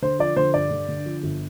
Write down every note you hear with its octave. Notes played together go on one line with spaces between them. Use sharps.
D3 C5
F3 D5
D3 C5
G2 D5
D3
D3
F3
G1